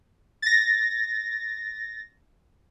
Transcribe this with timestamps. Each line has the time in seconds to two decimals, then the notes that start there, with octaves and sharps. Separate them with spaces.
0.42 A6 A#6